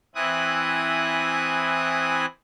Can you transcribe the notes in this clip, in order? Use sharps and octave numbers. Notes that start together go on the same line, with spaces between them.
E3 C4 E4 G#5 D#6 F#6